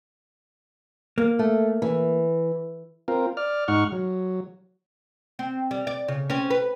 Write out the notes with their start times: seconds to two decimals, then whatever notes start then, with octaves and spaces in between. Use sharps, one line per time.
1.18 A#3
1.39 A3
1.82 E3
3.08 C4 F4 A#4
3.37 D5 F6
3.68 G#2 D#4 F#5 C#6 F6
3.92 F#3
5.39 C4
5.71 G3
5.87 D5
6.08 C#3
6.30 C4 C#4
6.50 B4